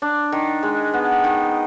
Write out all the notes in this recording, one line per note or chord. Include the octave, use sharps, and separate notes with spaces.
D4
D#3
G#3
B3
D#3